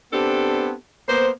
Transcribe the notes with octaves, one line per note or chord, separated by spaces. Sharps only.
B3 C4 D4 G4 A4
A#3 B3 C5